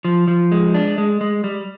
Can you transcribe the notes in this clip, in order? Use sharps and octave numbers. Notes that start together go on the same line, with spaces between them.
F3
F3
G#3
D4
G#3
G#3
G3